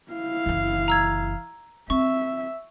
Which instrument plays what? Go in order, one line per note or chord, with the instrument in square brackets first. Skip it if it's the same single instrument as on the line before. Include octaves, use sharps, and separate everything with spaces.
[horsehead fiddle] E4 F5
[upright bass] F#1 E3
[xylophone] A#5 E6 G#6
[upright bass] C4 [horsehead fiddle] E5 [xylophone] C#6